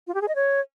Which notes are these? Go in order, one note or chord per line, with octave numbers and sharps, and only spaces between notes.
F4
G4
G#4
D#5
C#5